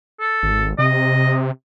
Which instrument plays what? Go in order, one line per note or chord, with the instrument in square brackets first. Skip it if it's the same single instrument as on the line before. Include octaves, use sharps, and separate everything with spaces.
[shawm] A4
[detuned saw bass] G#1
[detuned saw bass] C3 [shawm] D#5